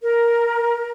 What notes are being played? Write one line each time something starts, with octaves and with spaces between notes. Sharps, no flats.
A#4